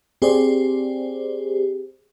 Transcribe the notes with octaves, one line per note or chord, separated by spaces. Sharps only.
C4 G4 G#4 C5 D5